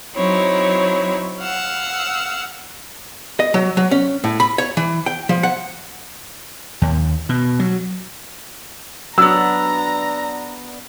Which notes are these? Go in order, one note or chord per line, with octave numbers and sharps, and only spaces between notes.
F#3 C4 D#4 E4 C#5
F5 F#5 E6
D#5
F#3
F#3
C#4
A2
B5
C#5
E3
G5
F3
F#5
D#2
B2
F#3
F#3 B3 D4 A#5 E6